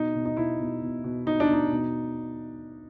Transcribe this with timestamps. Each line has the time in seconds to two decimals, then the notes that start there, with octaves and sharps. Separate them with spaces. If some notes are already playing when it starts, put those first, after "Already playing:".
Already playing: B2 D#4
0.15 B2
0.25 D#4
0.37 B2 E4
0.59 B2
0.82 B2
1.04 B2
1.26 B2 D#4
1.40 D4
1.48 B2
1.53 D#4
1.71 B2